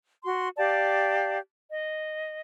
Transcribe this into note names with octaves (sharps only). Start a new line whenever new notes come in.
F#4 C6
G4 D5 F5 A5
D#5